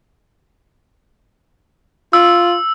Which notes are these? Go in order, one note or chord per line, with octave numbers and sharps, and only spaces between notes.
F4 E6